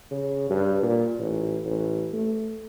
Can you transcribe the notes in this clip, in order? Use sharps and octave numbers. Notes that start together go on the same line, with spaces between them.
C#3
G2
A#2
A1
A1
A3